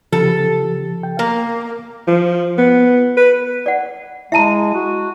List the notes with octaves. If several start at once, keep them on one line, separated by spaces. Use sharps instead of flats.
C#3 F3 G4 A4
G5
A#3 A#4
F3
B3
B4
D5 F#5
G#3 E4 E5 A5 A#5 D#7
F#4